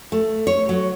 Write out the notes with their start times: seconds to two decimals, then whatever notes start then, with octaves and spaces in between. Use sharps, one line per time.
0.12 A3
0.47 C#5
0.69 F#3